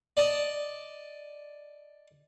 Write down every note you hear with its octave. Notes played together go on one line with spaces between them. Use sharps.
D5 D#5 A5